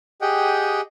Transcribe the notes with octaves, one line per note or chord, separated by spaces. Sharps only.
G4 G#4 D#5 F#5 G5